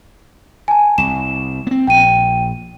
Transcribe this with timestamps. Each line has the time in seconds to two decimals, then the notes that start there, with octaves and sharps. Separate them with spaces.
0.68 G#5 A5
0.98 C2 E7
1.67 B3 C4
1.87 A#1 G5 D#7